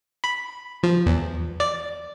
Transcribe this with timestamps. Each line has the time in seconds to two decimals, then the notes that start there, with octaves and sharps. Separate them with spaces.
0.24 B5
0.83 F3
1.06 E2
1.60 D5